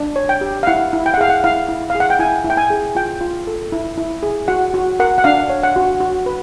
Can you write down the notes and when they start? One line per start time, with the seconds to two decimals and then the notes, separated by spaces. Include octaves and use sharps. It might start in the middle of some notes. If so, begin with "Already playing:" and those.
Already playing: D4
0.16 C#5
0.29 G5
0.41 G4
0.63 F5
0.67 E4 F#5
0.93 E4
1.06 G5
1.14 F#5
1.17 G#4 F5
1.30 F#5
1.44 E4 F5
1.69 E4
1.90 F5
1.95 G#4
2.00 F#5
2.10 G5
2.19 E4 G#5
2.45 E4
2.50 G5
2.57 G#5
2.70 G#4
2.95 F4 G5
3.21 F4
3.47 A4
3.72 E4
3.98 E4
4.23 G#4
4.48 F#4 F#5
4.74 F#4
5.00 A#4 F#5
5.18 F#5
5.24 D4 F5
5.50 C#5
5.63 F#5
5.76 F#4
6.00 F#4
6.26 B4